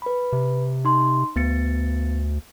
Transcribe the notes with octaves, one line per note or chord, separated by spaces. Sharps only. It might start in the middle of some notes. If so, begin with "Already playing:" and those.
B4 B5
C3
D#4 C6
D2 B3 A6 C#7